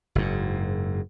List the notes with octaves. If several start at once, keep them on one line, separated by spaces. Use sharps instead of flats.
F#1 G#2